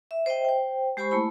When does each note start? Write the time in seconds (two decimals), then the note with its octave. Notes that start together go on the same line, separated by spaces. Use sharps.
0.11 E5
0.26 C5 D#5 E5 G5
0.45 C5 G5
0.97 G#3 G4 C5 G#5 B5 C#6
1.11 A3 A#3 E4 B5